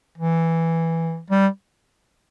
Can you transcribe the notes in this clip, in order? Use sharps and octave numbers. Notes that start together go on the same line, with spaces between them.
E3
G3